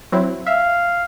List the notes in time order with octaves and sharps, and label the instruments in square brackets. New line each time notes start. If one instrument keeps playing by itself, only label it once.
[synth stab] F#3 C4 E4
[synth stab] E5 [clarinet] F5